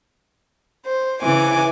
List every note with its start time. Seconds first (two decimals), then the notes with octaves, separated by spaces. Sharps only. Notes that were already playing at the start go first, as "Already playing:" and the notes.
0.85 C5
1.21 C#3 E3 G#5 D6